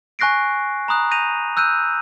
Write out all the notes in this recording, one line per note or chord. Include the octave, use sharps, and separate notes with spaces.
G#5 C#6 F#6 A#6 C7 D7
A#5 B5 D#6 F#6
G6 A#6 D#7 F7
E6 F#6 G6 D#7